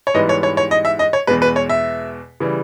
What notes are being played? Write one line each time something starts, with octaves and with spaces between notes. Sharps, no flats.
C#5
G#2 E3 G3 B3 D#5
C#5
C#5
C#5
D#5
E5
D#5
C#5
E2 B2 G#3 B4
B4
C#5
E5
C#3 E3 G3